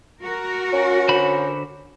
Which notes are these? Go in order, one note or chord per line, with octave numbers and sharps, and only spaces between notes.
F#4 A#4
C#4
D3 C5 B5